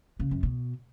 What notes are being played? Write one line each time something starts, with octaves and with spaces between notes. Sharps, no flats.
C#3
F#2
B2